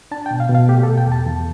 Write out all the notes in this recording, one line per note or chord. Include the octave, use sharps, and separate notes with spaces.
D4 A5
G5
B2
F5
B2
F5
A3 G4
A4
B2
G5
E2 A5
E2